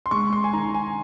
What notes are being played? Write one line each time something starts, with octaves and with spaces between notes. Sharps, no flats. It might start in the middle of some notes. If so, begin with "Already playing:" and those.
C6
G#3 C#6
C6
G#5
D#3 A#5
G#5